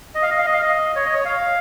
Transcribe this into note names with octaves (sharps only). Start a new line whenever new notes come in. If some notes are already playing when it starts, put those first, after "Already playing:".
D#5
F5
D#5
F5
D#5
F5
D#5
C#5
D#5
C#5
F5